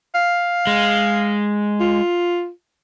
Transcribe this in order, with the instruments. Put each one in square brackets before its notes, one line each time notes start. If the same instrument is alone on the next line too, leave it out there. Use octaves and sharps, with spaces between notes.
[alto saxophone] F5
[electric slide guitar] G#3
[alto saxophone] F4